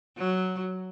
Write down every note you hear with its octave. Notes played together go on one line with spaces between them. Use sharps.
F#3